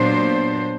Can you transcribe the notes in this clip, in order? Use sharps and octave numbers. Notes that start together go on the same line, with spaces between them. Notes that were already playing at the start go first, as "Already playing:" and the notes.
Already playing: A#2 F#3 B3 D4 C5